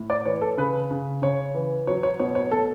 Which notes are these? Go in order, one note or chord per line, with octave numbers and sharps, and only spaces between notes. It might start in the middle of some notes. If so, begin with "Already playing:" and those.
Already playing: A2
D5
E3 C#5
A4
C#3 B4
C#3
C#3 C#5
E3
F#3 C#5
C#5
B2 C#5
C#5
B2 A4